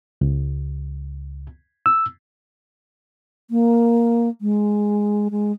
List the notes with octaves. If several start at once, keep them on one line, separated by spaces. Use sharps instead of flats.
C#2
E6
A#3
G#3
G#3